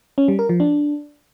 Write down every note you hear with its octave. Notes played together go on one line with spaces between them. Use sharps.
C#4
G3
A#4
F3
D4